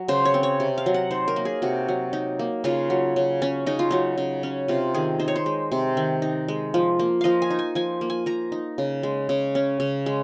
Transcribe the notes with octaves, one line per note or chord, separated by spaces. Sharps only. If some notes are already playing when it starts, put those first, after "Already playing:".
Already playing: F#3
C#3 C5
C#5
C4
C#5
C3
F5
F#3
F#5
D#4 C5
A#4
A#3
G#4
C3 F#4
F#3
D#4
A#3
C#3 F4
F#3
C#3
C#4
C#3 D#4
F4
F#3 D#4
C#3
C#4
C3 F4
D#3 G#4
D#4 C5
C#5
C5
G#3
C3
D#3
D#4
G#3
F3
A#3
F3 D#5 F5
G#5
D#4
G#5
F3 G#5
A#3
G#5
F3 A#5
D#4
C#3
G#3
C#3
C#4
C#3
G#3